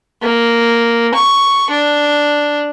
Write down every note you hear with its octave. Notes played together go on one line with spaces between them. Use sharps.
A#3
C#6
D4